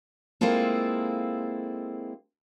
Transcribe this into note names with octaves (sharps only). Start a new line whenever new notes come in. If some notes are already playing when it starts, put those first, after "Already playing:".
G#3 A#3 C4 E4 F4 A4